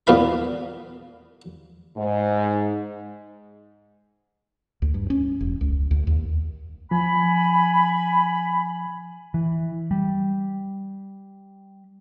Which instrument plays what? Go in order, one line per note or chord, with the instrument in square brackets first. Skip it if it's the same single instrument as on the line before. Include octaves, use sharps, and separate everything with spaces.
[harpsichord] E2 A#2 B3 F5 B5
[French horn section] G#2
[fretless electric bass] D2
G2
C#4
E1
C#2
D2
D#2
[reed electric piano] F3 [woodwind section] G#5 B5
[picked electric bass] E3
G3